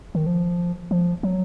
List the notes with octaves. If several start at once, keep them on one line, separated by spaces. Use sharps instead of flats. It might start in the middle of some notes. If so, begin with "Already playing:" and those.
D#3
F3
F3
F#3